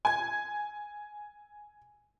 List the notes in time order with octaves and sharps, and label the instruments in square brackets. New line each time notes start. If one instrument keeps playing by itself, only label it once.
[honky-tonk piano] G#5 G#6